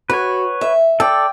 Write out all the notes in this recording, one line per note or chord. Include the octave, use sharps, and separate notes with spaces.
F#4 B4 C#5
E5
A4 D5 G5